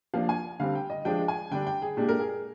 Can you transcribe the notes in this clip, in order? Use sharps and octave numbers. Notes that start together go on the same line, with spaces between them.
F3 A#3 D4 F5
G#5
D3 G3 C4 F5
G5
D#5
F3 G#3 D4 G5
G#5
D3 G3 D4 G5
G5
G#4
A#2 G#3 D4 G4
A#4
G#4